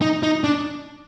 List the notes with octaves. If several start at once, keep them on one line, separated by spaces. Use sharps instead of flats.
D#4
D#4
D4